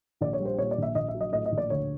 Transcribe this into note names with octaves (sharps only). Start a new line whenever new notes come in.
A#1 D5
C#5
G3
C5
A#2 C#5
D5
A#1 E5
A#1 D#5
E5
F#3
D#5
A2 D#5
D#5
A#1
D5
D2 C#5